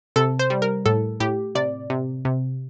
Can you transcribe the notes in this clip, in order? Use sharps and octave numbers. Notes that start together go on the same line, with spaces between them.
C3 A4
C5
G3
A#4
A2 A4
A2 G4
C3 D5
C3
C3